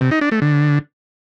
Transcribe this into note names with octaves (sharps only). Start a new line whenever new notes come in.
C3
D#4
D4
A3
D3